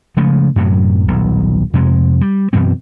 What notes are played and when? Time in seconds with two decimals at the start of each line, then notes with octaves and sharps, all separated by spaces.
0.17 C#3 F3 G#3 A3
0.56 F#2 A2 C3 F#3
1.08 D#1 B1
1.74 F2 C3 G#3
2.21 G3
2.53 F#2 B2 E3 C4